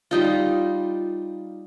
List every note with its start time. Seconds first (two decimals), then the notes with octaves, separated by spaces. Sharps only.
0.11 G3 D#4 F4